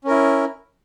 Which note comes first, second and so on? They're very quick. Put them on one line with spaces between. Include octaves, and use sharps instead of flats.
C#4 A#4 E4